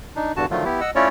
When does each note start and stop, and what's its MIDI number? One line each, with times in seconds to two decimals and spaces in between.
0.16 0.33 62
0.16 0.33 63
0.36 0.46 40
0.36 0.46 43
0.36 0.46 50
0.36 0.46 66
0.36 0.46 81
0.51 0.64 50
0.51 0.64 51
0.51 0.64 53
0.51 0.64 54
0.51 0.64 57
0.51 0.64 65
0.65 0.81 59
0.65 0.81 64
0.65 0.81 67
0.81 0.91 75
0.81 0.91 78
0.81 0.91 88
0.96 1.09 57
0.96 1.09 61
0.96 1.09 64
0.96 1.09 65
0.96 1.09 73
0.96 1.09 74